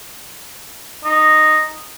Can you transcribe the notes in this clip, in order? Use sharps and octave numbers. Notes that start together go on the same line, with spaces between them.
D#4